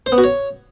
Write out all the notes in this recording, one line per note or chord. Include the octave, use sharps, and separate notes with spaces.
C5
B3
F#4
C#5